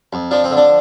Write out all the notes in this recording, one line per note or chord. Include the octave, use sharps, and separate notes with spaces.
F2
F3 D4
C4
D3
D4